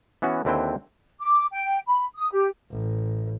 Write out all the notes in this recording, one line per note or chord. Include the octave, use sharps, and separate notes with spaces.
E3 B3 C#4 F#4
D#2 D3 C4 E4 B4 G5
D6
G5
B5
D#6
G4
A1